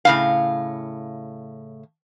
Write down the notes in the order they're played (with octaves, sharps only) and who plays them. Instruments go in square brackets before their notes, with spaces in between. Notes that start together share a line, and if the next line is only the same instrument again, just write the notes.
[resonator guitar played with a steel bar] A2 C#3 F5